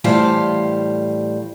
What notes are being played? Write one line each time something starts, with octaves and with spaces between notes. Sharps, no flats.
A2 E3 G3 C5 F5 A5